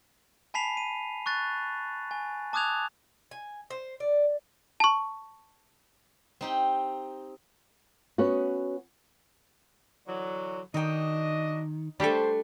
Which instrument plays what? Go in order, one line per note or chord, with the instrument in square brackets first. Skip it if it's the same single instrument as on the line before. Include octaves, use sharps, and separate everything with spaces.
[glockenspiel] G#5 A5 B5 B6 C7 F7
D#7
C#6 F#6 A6
G#5
A5 D6 D#6 F#6 G#6 F7
[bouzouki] G#5
C5
D5
[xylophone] A5 C#6
[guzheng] C4 D#4 G4
[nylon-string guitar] B3 C#4 F#4
[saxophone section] D3 E3 F#3
[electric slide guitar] D#3 [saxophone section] D4 F#4 D#5 [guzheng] D#4 G5
[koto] G3 G4 A4 [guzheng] A3 D4 [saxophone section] C5